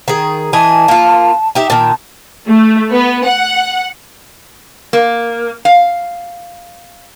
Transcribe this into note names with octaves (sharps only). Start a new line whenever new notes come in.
D#3 G#4
E3 D#5 G#5 A5
A#3 F4
D#4 G4 E5
A#2 D#3 A5
A3
B3
F#5
A#3
F5